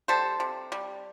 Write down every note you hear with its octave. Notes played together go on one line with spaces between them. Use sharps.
G3 A4 C5
C3
G3